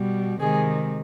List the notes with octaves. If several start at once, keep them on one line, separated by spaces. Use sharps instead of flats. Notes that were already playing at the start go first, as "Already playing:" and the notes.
Already playing: B2 G3
C3 D#3 G#3 G#4